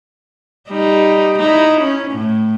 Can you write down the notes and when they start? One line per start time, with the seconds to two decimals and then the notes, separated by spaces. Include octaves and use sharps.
0.69 G3 D#4
1.39 D#4 E4
1.81 C#4
2.11 A2